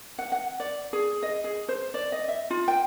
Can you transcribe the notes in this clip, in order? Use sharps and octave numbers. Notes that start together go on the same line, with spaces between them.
F#5
F#5
D5
G#4
D#5
G#4
C5
D5
D#5
E5
F4
G5